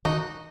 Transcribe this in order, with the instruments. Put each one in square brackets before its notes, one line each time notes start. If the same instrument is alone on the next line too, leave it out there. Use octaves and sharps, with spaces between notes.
[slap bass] D#3 [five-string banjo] D#4 F#4